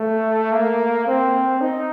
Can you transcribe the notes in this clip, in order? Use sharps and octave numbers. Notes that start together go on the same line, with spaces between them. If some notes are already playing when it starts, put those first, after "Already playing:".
Already playing: A3
A#3
C4
D#4